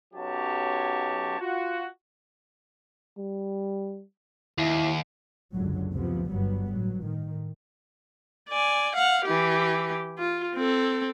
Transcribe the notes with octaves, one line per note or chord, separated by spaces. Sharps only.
B1 F#3 C#4 G4 C#5 A5
F4 F#4
G3
D#2 E4
F#1 C#2 G#2 D3 F#3
D2 C3 F3 B3
G1 G2 F#3 G3 B3
A2 F#3
A2 D#3
D5 G#5
F5 F#5
E3 G4
F4
C4 A4